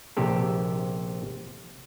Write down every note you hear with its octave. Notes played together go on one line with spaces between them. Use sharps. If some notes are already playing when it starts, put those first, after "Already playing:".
A#1 C3 G4 A4